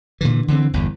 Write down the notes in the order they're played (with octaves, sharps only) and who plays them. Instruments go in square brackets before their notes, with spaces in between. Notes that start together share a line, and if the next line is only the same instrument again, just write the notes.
[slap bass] A#2 D3 E3
D3 E3 G3 C4
G1 E2